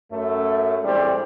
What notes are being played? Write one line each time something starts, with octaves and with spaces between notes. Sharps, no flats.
F#2 A3
A2 E3 G3 G#3 C4 D4